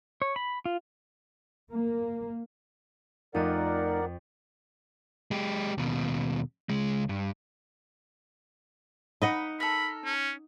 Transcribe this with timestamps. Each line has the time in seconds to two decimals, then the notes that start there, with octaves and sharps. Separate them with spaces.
0.22 C#5
0.36 B5
0.66 F4
1.72 A#3
3.35 F2 A3 D#4 F4 A#4 D5 F#5 D#7
5.31 G#3 G4
5.78 D#2 B2
6.69 C#2 G#3
7.09 G2
9.22 D#4 D#5 F#5 B5
9.60 A4 A#4 B5
10.05 C#4